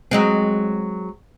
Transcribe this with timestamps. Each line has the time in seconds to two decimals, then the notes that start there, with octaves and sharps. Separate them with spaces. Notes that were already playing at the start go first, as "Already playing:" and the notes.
0.11 F#3 G#3 C4